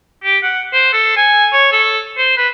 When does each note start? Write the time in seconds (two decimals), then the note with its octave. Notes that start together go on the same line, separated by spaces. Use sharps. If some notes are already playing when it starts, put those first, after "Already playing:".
0.24 G4
0.43 F#5
0.73 C5
0.93 A4
1.17 G#5
1.53 C#5
1.72 A4
2.18 C5
2.38 B4